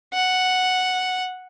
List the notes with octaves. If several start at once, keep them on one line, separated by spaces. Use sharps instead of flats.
F#5